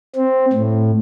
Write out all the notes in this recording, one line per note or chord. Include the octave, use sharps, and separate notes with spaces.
C4
A2